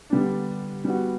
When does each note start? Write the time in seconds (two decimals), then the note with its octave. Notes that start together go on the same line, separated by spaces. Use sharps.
0.10 D3 G3 B3 D4
0.85 G3 B3 F#4